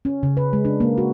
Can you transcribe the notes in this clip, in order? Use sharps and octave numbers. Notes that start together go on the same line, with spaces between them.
C#4
C#3
B4
G#3
D4
A#3
F#4